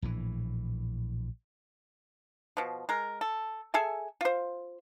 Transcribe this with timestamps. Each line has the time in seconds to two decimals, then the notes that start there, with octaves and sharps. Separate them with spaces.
0.02 A#1 A2 E3
2.57 B2 F3
2.89 G#3 A#4
3.21 A4
3.74 G#4 A4 E5 G#5
4.21 F4 C5